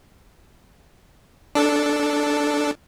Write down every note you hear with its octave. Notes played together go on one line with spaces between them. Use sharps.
D4 A4